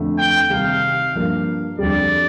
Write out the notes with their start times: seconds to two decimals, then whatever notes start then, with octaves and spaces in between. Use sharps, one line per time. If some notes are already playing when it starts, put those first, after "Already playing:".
Already playing: F2 D3 A3
0.18 G5
0.50 C3 D#3 G3 F5
1.15 G2 F3 A#3
1.79 F2 D3 G3 D5